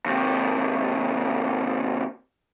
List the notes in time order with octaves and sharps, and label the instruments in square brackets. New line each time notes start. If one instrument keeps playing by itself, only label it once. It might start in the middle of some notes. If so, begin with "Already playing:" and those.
[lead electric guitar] D#2 C3